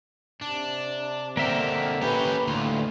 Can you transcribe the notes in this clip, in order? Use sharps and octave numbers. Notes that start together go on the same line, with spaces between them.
C3 D4
D3 A#3 C4 A#4 E5 G5
C#4 G4 B4
D2 A2 F4